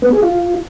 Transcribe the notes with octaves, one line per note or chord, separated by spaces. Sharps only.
B3
G#4
F4